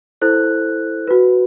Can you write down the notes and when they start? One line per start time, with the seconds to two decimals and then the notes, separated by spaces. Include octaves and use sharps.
0.21 E4 A4 C5 F#6
1.07 F#4 B4